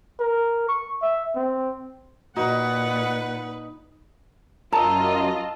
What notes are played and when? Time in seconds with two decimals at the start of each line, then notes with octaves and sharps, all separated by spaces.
0.20 A#4
0.68 C#6
1.02 E5
1.36 C4
2.36 A#2 D#4 F#4 B4 F#5
4.72 F#2 F4 A#4 D#5 A5 A#5 E6